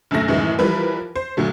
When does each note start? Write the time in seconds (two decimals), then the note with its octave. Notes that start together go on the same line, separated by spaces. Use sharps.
0.11 A#1 F#2 D3 A3 A#6
0.28 C2 F#2 A2 D#3 E3 G#3
0.59 E3 F3 G3 A#4 B4
1.16 C5
1.37 A#2 D3 F#3 A3